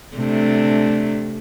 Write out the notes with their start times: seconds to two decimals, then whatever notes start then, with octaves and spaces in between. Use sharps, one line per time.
0.16 C3 A3 D4